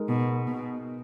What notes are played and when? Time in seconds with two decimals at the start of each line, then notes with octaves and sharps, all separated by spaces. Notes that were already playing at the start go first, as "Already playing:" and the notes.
Already playing: G#3 D#4 A#4
0.09 B2
0.47 B2